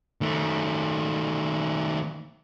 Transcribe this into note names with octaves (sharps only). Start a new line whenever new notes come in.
D#3 A3